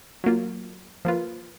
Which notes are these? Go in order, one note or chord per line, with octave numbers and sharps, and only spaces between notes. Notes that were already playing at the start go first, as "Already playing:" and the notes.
F#3 A#3 F4
F3 A#3 F4 B4